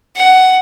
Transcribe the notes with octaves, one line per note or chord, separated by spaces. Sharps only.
F#5